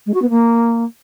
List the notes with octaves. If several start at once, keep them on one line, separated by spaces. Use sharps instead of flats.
G#3
F#4
B3
A#3